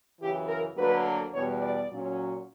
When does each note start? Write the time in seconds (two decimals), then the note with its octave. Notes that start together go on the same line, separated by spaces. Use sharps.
0.20 F#2 C#3 E3 G4
0.48 A#4
0.77 D2 D3 F#3 A#3 B4
1.33 E2 B2 G3 C#5
1.61 D5
1.89 A#2 F#3 C#4